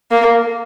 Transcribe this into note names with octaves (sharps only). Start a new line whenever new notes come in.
A#3